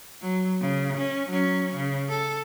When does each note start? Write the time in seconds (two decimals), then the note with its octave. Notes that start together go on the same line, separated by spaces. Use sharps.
0.21 F#3
0.61 C#3
0.98 C#4
1.30 F#3 C#4
1.75 C#3
2.09 A4